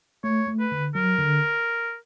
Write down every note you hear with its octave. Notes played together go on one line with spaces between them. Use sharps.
A3 C#5
A3
B4
D3
F#3 A#4
D3